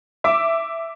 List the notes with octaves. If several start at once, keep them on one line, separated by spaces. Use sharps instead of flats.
E5 D6